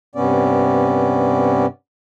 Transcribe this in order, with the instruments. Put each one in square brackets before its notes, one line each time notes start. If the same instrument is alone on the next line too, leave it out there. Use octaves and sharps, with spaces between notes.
[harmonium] G2 C3 B3 C#4 D5